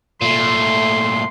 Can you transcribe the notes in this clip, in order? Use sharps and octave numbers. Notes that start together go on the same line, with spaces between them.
A#2 A3 C6